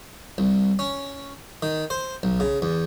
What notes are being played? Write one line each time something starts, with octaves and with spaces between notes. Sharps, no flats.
C2
C#4
D#3
C5
B1
C#3
E2